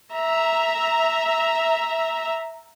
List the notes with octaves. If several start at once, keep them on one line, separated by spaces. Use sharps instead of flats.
E5 A#5